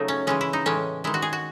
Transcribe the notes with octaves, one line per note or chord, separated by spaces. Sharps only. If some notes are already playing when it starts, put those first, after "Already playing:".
Already playing: C#3 F#3 A3 D#4
C#4
C#3 E3 G#3 C#4
E4
D#4
A2 E3 G#3 C#4
D#3 G#3 E4
F#4
G#4
F#4